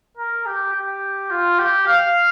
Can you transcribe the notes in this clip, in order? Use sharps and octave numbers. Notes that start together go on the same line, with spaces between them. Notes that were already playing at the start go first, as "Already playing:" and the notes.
A#4
G4
G4
F4
G4
F5